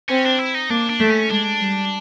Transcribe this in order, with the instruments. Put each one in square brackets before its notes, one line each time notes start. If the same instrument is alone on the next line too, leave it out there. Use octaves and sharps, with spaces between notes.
[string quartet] C4 [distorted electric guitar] C#4
[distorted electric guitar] D4
E4
D#4
[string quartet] A#3 [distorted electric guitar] D4
[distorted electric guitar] D4
[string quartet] A3
[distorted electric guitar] C#4
[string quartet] G#3 [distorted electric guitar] D4
[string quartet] G3